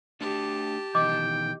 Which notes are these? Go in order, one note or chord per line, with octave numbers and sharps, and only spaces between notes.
A3 D4 G4 A4 A5
B2 D#3 E3 D#5 G5 D6